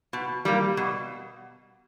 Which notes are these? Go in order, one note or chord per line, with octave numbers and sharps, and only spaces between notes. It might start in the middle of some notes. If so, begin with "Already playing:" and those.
B2
G3 A#3
B2